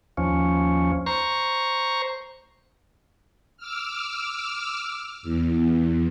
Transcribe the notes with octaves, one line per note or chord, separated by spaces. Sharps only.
D#2 F3 C#4
C5 A#5 C#6
D6 E6 F6
E2